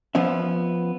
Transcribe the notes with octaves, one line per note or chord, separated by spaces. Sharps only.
F3 B3 C#4 E5